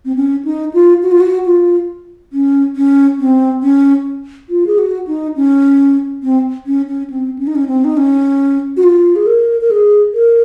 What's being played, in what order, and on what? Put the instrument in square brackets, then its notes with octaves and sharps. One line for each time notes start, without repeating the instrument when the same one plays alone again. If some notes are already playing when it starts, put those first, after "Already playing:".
[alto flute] C4
C#4
D#4
F4
F#4
F4
F#4
F4
C#4
C#4
C4
C#4
F4
G#4
F#4
D#4
C#4
C4
C#4
C#4
C4
C#4
D#4
C#4
C4
D#4
C#4
F#4
F4
G#4
A#4
A#4
G#4
A#4